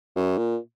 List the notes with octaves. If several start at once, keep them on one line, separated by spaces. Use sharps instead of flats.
F#2
A#2